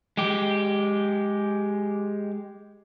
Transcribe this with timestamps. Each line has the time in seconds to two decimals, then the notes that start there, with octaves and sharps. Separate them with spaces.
0.17 G#3 G4